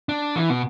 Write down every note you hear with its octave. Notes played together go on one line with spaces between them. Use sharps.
D4
E3
B2